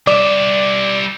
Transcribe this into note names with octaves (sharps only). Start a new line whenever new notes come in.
G3 D5 E5